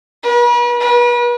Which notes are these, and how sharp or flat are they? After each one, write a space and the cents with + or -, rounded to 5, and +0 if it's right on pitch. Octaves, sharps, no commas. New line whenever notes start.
B4 -40
B4 -40